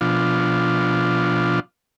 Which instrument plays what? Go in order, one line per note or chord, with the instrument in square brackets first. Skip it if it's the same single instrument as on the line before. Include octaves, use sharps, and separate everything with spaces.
[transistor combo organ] B2 F3 D4 F4